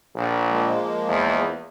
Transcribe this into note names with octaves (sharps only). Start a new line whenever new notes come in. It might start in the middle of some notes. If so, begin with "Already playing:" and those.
A#1
F3 G#3 A#3
E2